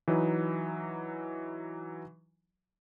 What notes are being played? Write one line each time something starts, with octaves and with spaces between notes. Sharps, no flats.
E3 F#3 D#4 B4